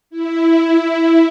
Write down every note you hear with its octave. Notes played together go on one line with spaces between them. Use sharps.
E4